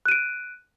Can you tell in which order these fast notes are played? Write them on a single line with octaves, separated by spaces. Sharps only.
F#6 D#7 D7